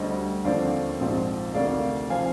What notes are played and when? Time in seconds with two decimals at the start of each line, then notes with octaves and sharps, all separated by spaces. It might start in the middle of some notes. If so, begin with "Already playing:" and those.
Already playing: D2 D3 G3 C5 D#5
0.44 D#2 D3 F3 C4 D5 F5
1.00 A#1 G#2 F3 C4
1.54 D2 C3 D#3 D5 F5
2.10 F3 C4 F5 G#5